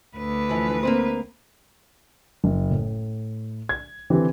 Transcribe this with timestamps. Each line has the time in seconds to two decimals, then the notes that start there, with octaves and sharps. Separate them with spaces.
0.17 D2 B4
0.49 E3 F3
0.83 A#3 C4 C5
2.44 F#1
2.71 A2
3.69 G#6
4.10 D3 E3 C4 G4 B4